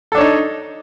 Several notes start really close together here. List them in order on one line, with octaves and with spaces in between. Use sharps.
A4 D4 C#5 D#4